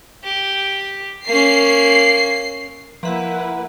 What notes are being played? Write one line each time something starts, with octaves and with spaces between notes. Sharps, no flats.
G4
A#3 C#4 C7
F3 A#3 E4 B4 E5 F#5 A#5 B5